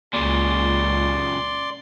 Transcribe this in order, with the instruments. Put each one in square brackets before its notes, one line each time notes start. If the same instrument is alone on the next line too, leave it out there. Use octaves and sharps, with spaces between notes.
[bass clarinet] C#2 [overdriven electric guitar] A#2 C#3 [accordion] D5 C6